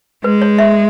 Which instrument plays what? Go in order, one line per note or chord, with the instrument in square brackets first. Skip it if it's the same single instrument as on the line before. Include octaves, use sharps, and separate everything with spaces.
[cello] G#3 [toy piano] B4
[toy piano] C#5
E5